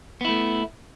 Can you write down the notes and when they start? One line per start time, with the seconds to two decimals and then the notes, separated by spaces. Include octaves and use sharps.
0.21 B3
0.25 E4
0.29 A3